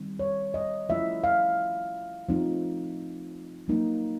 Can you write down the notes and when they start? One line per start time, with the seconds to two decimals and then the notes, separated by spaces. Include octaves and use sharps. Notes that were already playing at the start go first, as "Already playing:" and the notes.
Already playing: D#3 G3 C4
0.19 C#5
0.54 D#5
0.89 F3 A3 C#4 E4 E5
1.24 F5
2.29 F3 A3 C4 D#4
3.68 F#3 A#3 D#4